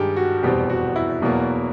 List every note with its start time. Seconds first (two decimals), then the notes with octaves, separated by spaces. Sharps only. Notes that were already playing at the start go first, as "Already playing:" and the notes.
Already playing: G2 D#3 G#3 G4 G#4
0.16 F#4
0.43 F1 E2 B2 G3 C4 G4
0.70 F#4
0.96 E4
1.22 E2 B2 F#3 A#3